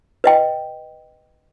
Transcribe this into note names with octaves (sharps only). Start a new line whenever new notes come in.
B4 D#5 G5